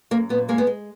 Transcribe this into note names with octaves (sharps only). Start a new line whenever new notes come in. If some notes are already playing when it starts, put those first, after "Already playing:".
F#2 A#3
A#2 B3
G#3 A#3
B3
G#3